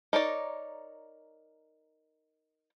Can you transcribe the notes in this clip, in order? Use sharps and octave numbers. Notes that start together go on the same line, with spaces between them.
D#4 A#4 C#5 D5